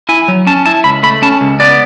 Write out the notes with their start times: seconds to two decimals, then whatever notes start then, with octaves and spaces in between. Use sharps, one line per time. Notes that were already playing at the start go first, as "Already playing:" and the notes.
0.09 E4 G#5
0.28 F#3
0.47 C#4 A5
0.66 E4 A5
0.84 C#2 B5
1.03 A3 B5
1.22 C#4 A5
1.41 C#2
1.60 B3 D5